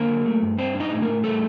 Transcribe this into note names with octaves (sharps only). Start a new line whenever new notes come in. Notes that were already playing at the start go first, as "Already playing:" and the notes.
Already playing: D3 A#3 A#4
F#3
A3
G2
G3 C4 C5
D4
D#4 D#5
A2
A#3 A#4
A2
G3 A3 A4